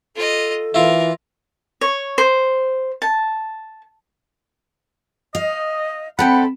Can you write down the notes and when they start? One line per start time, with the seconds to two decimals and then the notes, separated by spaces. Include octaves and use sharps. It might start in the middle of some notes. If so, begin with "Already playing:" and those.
0.16 F4 A4 D#5
0.74 E3 E4 F4 A#4
1.81 C#5
2.18 C5
3.02 A5
5.35 D#5 F5
6.19 D2 C4 A4 F#5 G5 B5